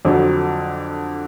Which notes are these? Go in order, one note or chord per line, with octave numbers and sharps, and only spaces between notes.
F2 D3 F#3